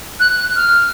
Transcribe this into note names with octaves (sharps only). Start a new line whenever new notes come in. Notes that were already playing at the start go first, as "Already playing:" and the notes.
F#6
F#6
F6